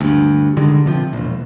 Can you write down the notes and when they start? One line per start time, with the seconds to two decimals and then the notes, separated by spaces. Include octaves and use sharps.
0.01 D2 G2
0.57 D3 D#3 G3 G#3
0.85 A#1 C3 D#3 F3
1.13 E1 A#1